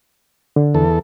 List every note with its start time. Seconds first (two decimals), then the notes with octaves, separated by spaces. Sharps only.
0.56 D3
0.74 E2 A4